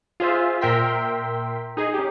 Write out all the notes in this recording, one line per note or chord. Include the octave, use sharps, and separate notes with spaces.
F4 G#4 C5 E5
A#2 A#4 E5 G5 C6 B6
D#4 G#4
C#4 G4